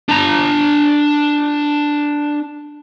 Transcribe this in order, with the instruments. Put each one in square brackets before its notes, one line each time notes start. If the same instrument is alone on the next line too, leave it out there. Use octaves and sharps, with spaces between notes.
[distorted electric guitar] D4 A#5